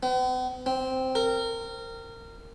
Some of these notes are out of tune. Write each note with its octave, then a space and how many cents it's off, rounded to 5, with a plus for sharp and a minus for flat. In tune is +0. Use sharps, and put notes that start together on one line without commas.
B3 +45
C4 -5
A#4 -25